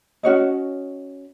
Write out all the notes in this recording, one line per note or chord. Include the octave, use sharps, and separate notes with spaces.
C#4 F#4 C#5 D#5